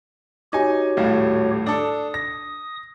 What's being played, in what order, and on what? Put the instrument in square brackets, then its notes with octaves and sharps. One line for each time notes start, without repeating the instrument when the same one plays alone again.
[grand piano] D#4 G#5 [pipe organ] F#4 G4 C#5
[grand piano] D#1 A2 F5
[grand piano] D4 A4 [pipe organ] D#6
[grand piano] A#6